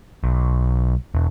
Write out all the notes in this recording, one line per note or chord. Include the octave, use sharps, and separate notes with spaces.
B1
E1